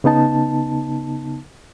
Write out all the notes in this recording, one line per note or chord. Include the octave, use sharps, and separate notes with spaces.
C#3 B3 D#4 A5